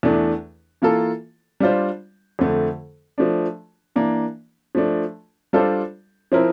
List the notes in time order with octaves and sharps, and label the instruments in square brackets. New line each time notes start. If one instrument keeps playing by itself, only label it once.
[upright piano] E2 E3 A3 D4
E3 A#3 F4 A4
G3 D4 F4 C5
F2 D3 A3
F3 A3 D4
E3 A#3 D4
F3 A3 D4
G3 D4 F4 A4 C5
F3 C4 E4 A#4